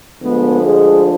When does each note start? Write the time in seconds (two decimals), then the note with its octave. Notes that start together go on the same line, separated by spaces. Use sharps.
0.21 D2 D3 F3 G#3 B3
0.61 G#3